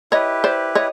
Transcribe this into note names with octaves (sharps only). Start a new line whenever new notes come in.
E4 G4 B4 C#5 D#5
C5 D5
C#5 D#5